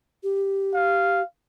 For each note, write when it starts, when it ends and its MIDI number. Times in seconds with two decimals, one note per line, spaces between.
0.23 1.22 67
0.74 1.25 77